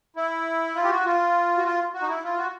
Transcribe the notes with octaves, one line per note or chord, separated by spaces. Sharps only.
E4
F4
G4
F#4
F4
F#4
F4
F#4
D#4
E4
F4
F#4